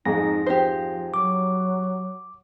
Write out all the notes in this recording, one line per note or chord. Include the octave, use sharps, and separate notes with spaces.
F2 G#2 G#3 D#4 A#6
F3 G4 C5
F#3 D6